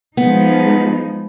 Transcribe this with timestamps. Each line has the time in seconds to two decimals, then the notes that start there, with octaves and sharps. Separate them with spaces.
0.17 F3 G#3 B3 D#4